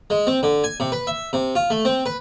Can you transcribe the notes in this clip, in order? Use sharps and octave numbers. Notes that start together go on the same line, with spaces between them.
G#3
C4
D3
G#5
C3
B4
E5
C3
F4
A3
C4
B4